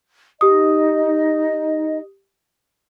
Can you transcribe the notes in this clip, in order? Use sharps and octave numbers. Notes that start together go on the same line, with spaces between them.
D#4 G4 D#5 D#6